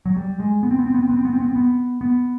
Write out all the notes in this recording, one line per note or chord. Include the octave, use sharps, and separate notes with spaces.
F#3
G3
G#3
B3
C4
B3
C4
B3
C4
B3
C4
B3
C4
B3
C4
B3
B3